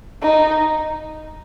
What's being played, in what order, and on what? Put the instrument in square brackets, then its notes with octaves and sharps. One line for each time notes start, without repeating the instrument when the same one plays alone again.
[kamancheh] D#4